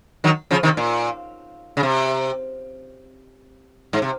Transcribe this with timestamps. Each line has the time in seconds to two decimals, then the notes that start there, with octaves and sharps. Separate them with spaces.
0.24 D#3 F#3
0.51 C#3 F3
0.63 C3 D#3
0.77 A#2
1.77 C#3
1.83 C3
3.93 G#2
4.02 C3